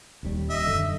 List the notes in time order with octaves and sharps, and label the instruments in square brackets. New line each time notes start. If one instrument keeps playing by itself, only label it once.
[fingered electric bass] D#1 D#2 G3
[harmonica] D#5 E5
[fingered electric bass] F#2 D3